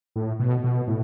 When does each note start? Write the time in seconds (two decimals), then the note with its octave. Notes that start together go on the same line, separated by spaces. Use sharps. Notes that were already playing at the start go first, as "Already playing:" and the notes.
0.16 A2
0.40 B2
0.64 B2
0.88 A2